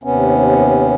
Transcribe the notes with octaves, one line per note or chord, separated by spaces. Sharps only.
D#2 C3 B3 C#4